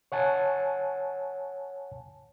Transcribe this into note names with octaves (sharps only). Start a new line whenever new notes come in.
C#5 F#5 G#5 A5